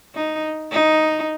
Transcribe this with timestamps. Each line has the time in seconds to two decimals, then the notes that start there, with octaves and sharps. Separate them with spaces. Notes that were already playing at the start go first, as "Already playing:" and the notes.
0.15 D#4
0.72 D#4